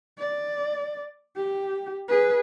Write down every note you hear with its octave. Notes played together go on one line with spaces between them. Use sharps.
D5
G4
G#4 B4